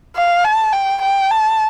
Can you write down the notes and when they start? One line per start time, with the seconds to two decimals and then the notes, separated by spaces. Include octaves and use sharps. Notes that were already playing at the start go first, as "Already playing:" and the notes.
0.16 F5
0.44 A5
0.73 G5
1.02 G5
1.31 A5